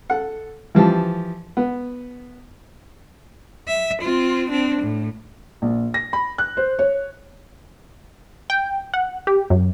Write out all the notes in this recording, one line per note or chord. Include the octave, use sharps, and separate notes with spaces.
A4 F#5
E3 F3 G4 A5
B3
E5
C4 F4
C4 D4
A2
A#1
A#6
B5
F#6
C5
C#5
G5
F#5
G4
F#2